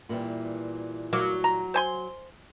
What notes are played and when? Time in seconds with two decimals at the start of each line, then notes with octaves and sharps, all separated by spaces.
0.09 A#2 E3 G3
1.13 F#3 A#3
1.44 A#5
1.74 C5 G#5 C6